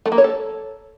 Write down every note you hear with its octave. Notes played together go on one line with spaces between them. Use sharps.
A3
A#3
C#5
A4